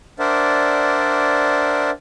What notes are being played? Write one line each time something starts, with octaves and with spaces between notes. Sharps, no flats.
D4 A#4 C5 D5 E5 F#5